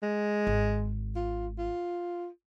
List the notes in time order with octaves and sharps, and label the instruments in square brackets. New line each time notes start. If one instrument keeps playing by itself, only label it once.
[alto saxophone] G#3
[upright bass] G#1
[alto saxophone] F4
F4